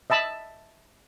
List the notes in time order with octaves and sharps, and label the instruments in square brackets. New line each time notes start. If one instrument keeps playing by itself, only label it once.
[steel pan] D#5 E5 A5 B5